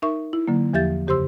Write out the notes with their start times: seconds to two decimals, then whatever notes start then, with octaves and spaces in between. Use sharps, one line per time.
0.02 D#4 A#4 E5 C#6
0.33 E4
0.48 D3 F#3 A#3
0.73 E2 F3 G4 E5 G6 A6
1.07 F#2 C#3 G4 C5 C6 E6